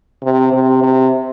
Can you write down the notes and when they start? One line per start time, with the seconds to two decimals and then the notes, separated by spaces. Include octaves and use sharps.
0.23 C3
0.52 C3
0.83 C3